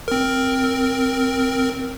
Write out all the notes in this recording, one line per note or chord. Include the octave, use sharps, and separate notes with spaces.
C4 A#4